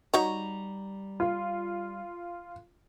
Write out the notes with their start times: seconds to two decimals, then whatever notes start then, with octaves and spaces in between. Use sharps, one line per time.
0.14 G3 D#4 F#4 C#5 A#5
1.20 F4